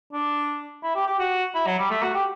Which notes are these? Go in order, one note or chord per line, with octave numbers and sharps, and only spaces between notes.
D4
E4
G4
G4
F#4
E4
F#3
G3
A3
F#4
G4